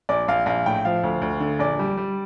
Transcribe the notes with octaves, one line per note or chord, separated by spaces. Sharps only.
A#1 D5
A#1 F5
A#1 F5
A2 G5
F3 F5
D2
D2
D3
A#1 D5
G3
G3